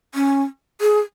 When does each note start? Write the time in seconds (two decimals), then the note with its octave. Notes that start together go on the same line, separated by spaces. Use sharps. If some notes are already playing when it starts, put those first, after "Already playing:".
0.15 C#4
0.81 G#4